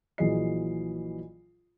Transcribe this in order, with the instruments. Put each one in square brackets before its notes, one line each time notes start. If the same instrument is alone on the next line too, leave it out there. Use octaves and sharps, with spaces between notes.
[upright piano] A#1 E3 F#3 G#4 D#5 C7